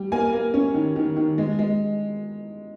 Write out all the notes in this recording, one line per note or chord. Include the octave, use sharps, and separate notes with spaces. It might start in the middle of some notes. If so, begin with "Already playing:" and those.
Already playing: G3
A#3 G#5
A#3
C#4
D#3
D#3
D#3
G#3
G#3